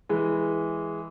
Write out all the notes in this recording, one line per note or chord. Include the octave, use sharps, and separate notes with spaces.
E3 G#3